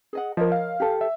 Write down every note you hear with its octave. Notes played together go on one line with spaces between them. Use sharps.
G#4 D#5 F#5
F3 A#4 C#5 D#5
F5
G4 A4
E5